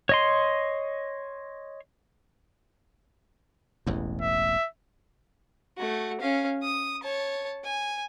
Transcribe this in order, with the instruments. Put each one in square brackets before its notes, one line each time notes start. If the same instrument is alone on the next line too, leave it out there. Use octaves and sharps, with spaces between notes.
[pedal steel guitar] C#5 D#5 C6
[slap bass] E1 A1 E2
[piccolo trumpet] E5
[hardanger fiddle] A3 F#4
C#4 F5
D#6
C#5 A5
G#5